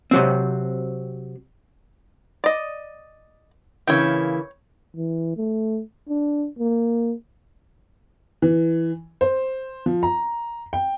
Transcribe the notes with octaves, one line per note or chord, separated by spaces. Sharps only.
C3 F#3 C4
D5 D#5
C#3 E3 A#3 C#5 G5
E3
A3
D4
A#3
E3
C5
F3
A#5
G5